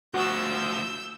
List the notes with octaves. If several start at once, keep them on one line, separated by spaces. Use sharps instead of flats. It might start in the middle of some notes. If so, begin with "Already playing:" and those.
D2 F3 F#4 E6 G6